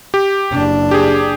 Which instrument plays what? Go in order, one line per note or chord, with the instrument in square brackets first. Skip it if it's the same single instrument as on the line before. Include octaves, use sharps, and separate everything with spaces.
[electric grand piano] G4
[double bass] F#1 D4
[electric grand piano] G4 G#4